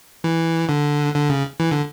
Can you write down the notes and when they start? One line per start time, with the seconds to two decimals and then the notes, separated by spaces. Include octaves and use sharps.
0.24 E3
0.69 D3
1.15 D3
1.29 C#3
1.60 E3
1.71 D3